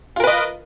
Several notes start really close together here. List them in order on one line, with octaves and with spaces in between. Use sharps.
F4 A#4 B4 D#5